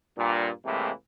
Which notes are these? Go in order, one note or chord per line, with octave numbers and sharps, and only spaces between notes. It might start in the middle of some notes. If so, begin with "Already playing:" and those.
G2 A#2
A2 C3 E3 G#3 A#3